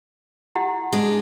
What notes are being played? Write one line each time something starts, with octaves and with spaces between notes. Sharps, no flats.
E4 G4 F#5
G#3 D4